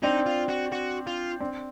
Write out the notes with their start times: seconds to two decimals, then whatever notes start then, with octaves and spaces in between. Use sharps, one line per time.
0.03 C4 D4 D#4
0.26 F4
0.49 F#4
0.72 F#4
1.07 F4
1.40 C4 D4